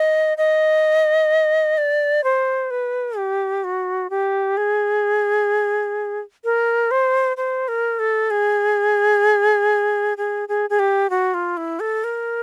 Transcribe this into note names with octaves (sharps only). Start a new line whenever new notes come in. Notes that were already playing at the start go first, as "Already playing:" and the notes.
Already playing: D#5
D#5
D5
C5
B4
G4
F#4
G4
G#4
A#4
C5
C5
A#4
A4
G#4
G#4
G#4
G#4
G4
F#4
F4
E4
A4
A#4